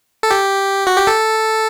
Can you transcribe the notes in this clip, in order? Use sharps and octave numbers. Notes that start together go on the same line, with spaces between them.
A4
G4
F#4
G4
A4